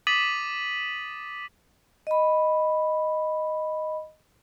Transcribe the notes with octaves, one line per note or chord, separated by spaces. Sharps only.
D6 D#6 A6 B6 D#7 F#7
D#5 B5